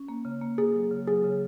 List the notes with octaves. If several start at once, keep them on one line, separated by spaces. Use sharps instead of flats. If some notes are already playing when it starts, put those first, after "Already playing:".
Already playing: C#4
A#3
C#3
A#3
A#3 G#4
F#3
C#3
F#3 G#4
C#3